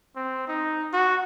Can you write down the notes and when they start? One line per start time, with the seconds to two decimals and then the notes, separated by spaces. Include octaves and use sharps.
0.16 C4
0.48 D#4
0.93 F#4